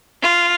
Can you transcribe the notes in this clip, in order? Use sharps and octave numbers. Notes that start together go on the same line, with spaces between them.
F4